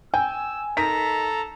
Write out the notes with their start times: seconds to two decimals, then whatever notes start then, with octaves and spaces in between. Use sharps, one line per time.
0.14 G5 G#5 E6
0.77 D#3 A4 A#5 B6